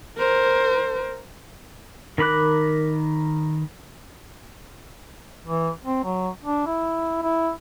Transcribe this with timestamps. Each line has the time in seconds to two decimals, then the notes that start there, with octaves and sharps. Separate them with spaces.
0.18 A#4 C5
2.18 D#3 A#4 B5 D6 F#6
5.45 E3
5.85 C4
6.04 F#3
6.43 D4
6.66 E4
7.23 E4